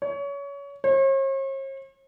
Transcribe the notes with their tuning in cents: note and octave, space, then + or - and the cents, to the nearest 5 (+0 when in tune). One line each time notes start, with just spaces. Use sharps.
C#5 +25
C#5 -45